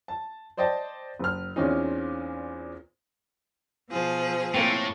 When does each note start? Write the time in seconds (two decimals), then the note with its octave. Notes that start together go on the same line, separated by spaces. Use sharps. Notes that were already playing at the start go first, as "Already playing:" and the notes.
0.08 A5
0.57 C5 D5 D#5 G5 A5
1.19 F#1 F6
1.56 E2 A#2 C4 C#4 D#4
3.90 B2 F3 G#4
4.54 A2 A3 A#3 C4